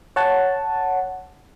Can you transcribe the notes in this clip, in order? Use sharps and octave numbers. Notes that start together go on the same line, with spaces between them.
C#5 F#5 A5